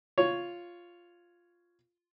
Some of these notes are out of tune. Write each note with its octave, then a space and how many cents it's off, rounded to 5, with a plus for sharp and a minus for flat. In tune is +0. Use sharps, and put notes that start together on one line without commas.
F4 +0 C#5 +5